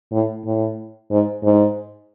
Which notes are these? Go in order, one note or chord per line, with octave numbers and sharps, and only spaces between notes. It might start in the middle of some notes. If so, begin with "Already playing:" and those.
A2
A2
G#2
G#2